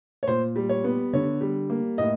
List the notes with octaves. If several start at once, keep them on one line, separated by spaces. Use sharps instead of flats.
C#5
A#2 C5
G3
C#5
B3
D3 C#5
G3
A#3
A2 D#5